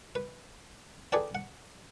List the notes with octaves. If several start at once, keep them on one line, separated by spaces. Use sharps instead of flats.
B4
G#4 A4 B4 D5 G5
F#5